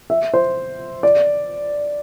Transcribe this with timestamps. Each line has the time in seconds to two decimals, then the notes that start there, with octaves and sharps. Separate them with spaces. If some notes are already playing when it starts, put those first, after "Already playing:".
0.10 E5
0.34 C5
1.03 D5